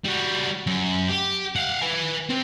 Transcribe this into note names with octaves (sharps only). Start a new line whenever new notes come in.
G3 F#4
F#2
G4
F5 F#5
B4 G#5
C4 G4